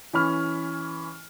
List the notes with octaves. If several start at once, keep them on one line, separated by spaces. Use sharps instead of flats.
E3 C#4 B5 F6